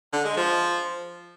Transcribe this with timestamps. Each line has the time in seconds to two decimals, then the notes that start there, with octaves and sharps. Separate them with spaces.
0.13 D3
0.25 G#3
0.37 F3